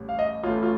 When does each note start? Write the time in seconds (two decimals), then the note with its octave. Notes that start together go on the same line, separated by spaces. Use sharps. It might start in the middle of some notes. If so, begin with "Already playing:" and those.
Already playing: A1 A2 G3
0.09 F5
0.19 D#5
0.43 A1 A2 A3 F4
0.63 F4